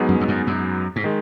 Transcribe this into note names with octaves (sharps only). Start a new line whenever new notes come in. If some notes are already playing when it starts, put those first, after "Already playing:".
Already playing: G#2 F#3 B3 D#4 G#4
F#2
E2
F#2
F#2
G#2
D#3 G#3